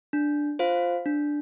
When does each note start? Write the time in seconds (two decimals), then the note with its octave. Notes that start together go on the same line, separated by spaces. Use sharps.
0.13 D4
0.59 F4 C5 F5
1.06 D4